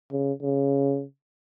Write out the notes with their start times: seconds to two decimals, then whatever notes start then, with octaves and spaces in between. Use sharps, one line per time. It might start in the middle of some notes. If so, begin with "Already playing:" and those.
0.11 C#3
0.42 C#3